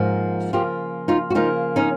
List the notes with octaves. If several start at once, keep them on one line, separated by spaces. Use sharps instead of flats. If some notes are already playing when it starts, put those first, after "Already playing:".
Already playing: G#2 F3 A#3
C#3 F3 A#3 F4 G4
D#4 F4
F#4
C#3 F3 A#3 D#4 F4
C#4 D#4